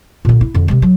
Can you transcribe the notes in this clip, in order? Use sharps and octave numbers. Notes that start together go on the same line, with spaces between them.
A#2 D3
E4
F2 D3
C3 G#3
F#3